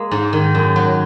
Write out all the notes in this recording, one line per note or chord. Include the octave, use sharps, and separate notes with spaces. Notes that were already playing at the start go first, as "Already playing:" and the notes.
Already playing: G#3 A#3
G#2
D#3
F#2
F#3